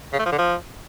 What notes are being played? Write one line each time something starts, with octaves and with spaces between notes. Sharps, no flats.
C#3
A3
F3
D3
F3